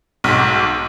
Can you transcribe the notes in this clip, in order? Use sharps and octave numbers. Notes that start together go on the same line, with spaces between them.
B1 G#2